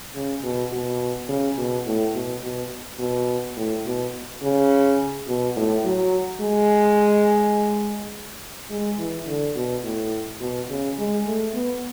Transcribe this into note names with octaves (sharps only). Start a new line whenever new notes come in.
C#3
B2
B2
C#3
B2
A2
B2
B2
B2
A2
B2
C#3
B2
A2
F#3
G#3
G#3
E3
D3
B2
A2
B2
C#3
G#3
A3
B3